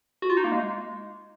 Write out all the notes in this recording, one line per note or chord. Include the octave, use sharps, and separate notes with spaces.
F#4
F4
D#4
A#3
G#3